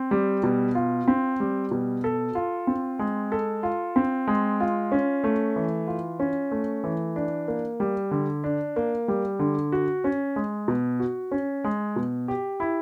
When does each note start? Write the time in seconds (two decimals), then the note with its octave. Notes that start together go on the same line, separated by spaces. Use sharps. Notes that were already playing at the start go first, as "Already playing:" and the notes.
Already playing: C4
0.11 G3
0.43 B2
0.75 F4
1.08 C4
1.40 G3
1.71 B2
2.04 A4
2.35 F4
2.67 C4
2.99 G#3
3.32 A4
3.63 F4
3.96 C4
4.28 G#3
4.60 F4
4.92 C#4
5.24 A3
5.56 E3
5.87 F4
6.19 C#4
6.51 A3
6.84 E3
7.16 D4
7.48 A#3
7.80 G3
8.11 D3
8.44 D4
8.76 A#3
9.08 G3
9.39 D3
9.72 F#4
10.04 C#4
10.36 G#3
10.68 B2
11.00 F#4
11.32 C#4
11.64 G#3
11.96 B2
12.28 G4
12.60 E4